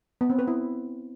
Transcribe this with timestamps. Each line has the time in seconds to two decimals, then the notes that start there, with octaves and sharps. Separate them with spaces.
0.21 B3
0.30 C4
0.39 B4
0.48 E4